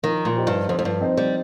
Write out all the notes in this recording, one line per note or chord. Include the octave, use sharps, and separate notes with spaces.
D#3 F3
A#2
D#4 G4 C5
G2
F2 F3
F2
G2
C4 D#4 C5
G3